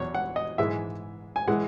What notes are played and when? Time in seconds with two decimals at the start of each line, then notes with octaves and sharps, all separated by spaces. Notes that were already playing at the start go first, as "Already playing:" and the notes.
Already playing: E2 B2 F#3 C#5
0.14 F#5
0.36 D#5
0.58 G#2 E3 G#3 E5
1.36 G#5
1.48 E3 G#3 F#5